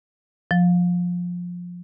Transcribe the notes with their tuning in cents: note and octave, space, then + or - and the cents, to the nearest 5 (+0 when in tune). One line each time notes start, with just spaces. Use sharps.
F3 +15